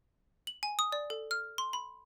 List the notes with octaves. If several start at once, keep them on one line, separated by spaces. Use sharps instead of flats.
F#7
G#5
D#6
D5
A4
F6
C6
B5